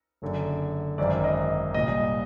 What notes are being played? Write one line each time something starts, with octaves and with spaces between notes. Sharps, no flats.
F#1 F#2 D3
G#1 F#2 D#3 D5
D#5
C2 A#2 D#5